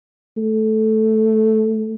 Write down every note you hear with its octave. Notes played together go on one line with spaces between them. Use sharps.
A3